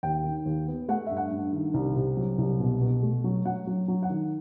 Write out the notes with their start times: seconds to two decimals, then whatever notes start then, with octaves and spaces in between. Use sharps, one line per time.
0.03 D#2 G5
0.24 D#3
0.46 D#2
0.68 B3
0.88 A3 F#5
1.07 G2 E5
1.17 F#5
1.31 G2
1.53 D#3
1.74 C2
1.96 C3
2.17 F#3
2.38 C2
2.60 B2
2.81 B2
3.03 A3
3.24 F#3
3.45 F#3 F#5
3.67 F#3
3.88 F#3
4.03 F#5
4.10 D#3